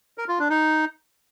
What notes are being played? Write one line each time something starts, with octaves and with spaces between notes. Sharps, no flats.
A#4
F4
D4
D#4